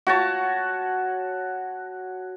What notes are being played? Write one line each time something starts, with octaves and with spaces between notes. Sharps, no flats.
F#4 C#5 A5